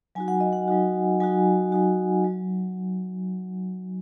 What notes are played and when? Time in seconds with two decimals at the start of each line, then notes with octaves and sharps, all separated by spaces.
0.15 F#3 D#4 F#4 G#5
0.28 F#5
0.40 D#5
0.53 F#5
0.68 F#3 D#4 F#4
1.20 F#3 D#4 F#4 G#5
1.72 F#3 D#4 F#4
2.24 F#3